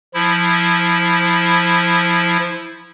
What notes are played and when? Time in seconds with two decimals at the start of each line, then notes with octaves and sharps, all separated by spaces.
0.14 F3 E4